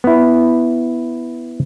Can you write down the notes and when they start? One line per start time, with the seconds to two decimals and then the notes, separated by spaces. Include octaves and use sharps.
0.04 B3 E4